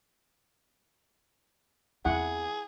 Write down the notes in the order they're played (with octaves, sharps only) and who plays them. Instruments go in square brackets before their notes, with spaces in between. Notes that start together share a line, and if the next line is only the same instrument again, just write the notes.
[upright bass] E2 C4 [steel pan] E4 F#5 [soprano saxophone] G#4